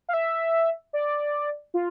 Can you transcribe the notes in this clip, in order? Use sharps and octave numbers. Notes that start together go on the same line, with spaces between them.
F5
E5
D5
F4